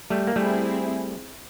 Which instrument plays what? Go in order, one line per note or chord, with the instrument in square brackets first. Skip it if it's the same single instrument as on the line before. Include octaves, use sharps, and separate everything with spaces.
[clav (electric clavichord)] G3 A3
A#3
[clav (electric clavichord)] G3 A3 [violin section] C4 E4 G#4